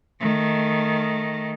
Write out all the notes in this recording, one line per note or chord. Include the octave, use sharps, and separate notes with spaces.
D#3 A3